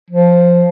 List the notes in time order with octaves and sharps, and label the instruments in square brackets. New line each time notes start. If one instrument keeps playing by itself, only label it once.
[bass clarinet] F3